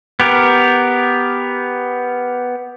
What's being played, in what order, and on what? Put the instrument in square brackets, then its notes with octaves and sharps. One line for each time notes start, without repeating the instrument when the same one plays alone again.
[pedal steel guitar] B3 G4 A#4